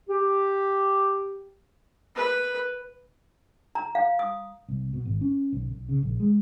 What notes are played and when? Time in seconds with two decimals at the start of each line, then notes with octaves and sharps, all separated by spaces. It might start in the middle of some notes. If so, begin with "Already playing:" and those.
0.09 G4
2.16 B4
3.75 A#5
3.95 F5
4.19 D#6
4.69 C2
4.93 B2
5.05 G#1
5.21 C#4
5.53 B1
5.71 B1
5.89 C#3
6.03 A#1
6.20 G#3